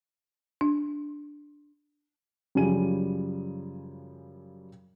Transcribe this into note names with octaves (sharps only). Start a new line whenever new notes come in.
D4
F#2 C#3 F3 G3 G#5 D#7